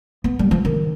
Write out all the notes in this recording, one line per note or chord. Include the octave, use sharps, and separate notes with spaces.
B3
G3
F3
D#3